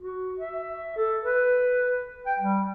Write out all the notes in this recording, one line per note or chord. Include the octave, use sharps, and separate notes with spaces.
F#4
E5
A4
B4
G5
G3